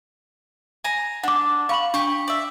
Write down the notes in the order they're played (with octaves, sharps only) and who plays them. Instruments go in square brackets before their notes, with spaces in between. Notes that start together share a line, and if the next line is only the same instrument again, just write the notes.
[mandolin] G#5 A#5
[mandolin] D4 [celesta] F#5 D6
[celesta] F5 B5 F#7 [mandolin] C#6
[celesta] D4 [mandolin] G4 C#6
[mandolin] D5 E5